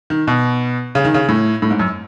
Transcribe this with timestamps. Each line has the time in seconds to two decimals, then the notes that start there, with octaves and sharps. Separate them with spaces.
0.10 D#3
0.27 B2
0.95 C#3
1.04 D#3
1.14 C#3
1.29 A2
1.62 A2
1.71 G#2
1.79 F#2